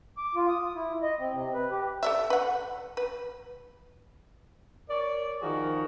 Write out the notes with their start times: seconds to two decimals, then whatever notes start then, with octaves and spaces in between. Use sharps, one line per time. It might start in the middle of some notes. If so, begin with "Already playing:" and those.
0.17 D6
0.35 F4
0.49 D#6
0.75 E4
1.02 D#5
1.19 C4
1.33 C3
1.54 B4
1.71 G4
2.03 A4 D5 E5
2.30 B4 F#5
2.97 B4
4.89 A#4 C#5 D5
5.42 D#3 F3 F#4 G#4 A#4